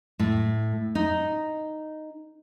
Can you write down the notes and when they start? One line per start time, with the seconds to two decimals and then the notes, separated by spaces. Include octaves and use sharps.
0.19 A2
0.95 D#4